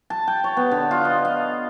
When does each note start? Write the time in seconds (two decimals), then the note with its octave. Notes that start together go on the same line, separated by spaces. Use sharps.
0.10 A5
0.27 G5
0.44 C#5
0.57 B3
0.71 D3
0.91 F4
1.05 D#5
1.25 F5